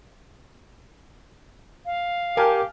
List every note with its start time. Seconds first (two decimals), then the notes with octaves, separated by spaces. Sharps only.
1.85 F5
2.37 G4 A#4 G#5 A5 F6